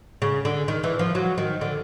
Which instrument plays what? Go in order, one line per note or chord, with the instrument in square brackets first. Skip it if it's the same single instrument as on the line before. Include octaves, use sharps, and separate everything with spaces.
[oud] C#3
D3
D#3
E3
F3
F#3
D#3
D3